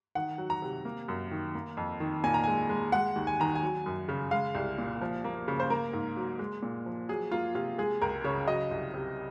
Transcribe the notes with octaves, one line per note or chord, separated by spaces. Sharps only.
D#3 F#5
F#3
A#5
C3
A#3
F#2
D#3
A#3
F2
D#3
A#2 G#5
A#5
G#3 G#5
G#3
G#3 F#5
D#2
G#5
D#3 A#5
G#5
F#3
F#2
C#3
G#3 F5
C2
A#2
F3
A#3
C#3
C5
A#3 A#4
G#2
F#3
G#3
A#2
F3
F#3 G#4
A#3 F4
C3 F4
G#3 G#4
C#2 A#4
C#3 C#5
F#3 D#5
C2
C3